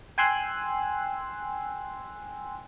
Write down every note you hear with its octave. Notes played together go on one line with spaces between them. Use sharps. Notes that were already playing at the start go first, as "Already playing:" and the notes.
G5 G#5 C6 E6 F#6